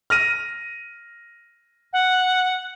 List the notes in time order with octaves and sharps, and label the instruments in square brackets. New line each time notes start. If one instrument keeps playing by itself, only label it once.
[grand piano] F6 A#6 D#7
[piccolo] F#5